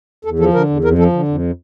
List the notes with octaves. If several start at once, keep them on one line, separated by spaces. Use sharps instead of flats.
E2 A4
F3 A4
D3 A#4
E2
F2 A#4
F3 A4
D3
F2